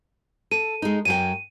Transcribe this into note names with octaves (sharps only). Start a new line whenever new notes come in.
A4 D#7
G#3 D#4
F#2 F#3 G5 D#7